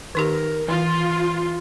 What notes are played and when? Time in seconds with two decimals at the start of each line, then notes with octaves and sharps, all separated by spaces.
0.15 D#3 D#4 G4 A#4
0.68 E3 F4 C6